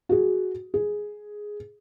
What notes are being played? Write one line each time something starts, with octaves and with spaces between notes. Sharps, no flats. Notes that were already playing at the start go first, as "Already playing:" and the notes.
F#4 G#4
G#4